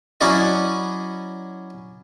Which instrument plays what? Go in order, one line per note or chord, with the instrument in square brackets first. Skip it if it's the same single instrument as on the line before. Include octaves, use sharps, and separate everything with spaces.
[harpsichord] F#3 C#4 E4 F#4 D5 D#5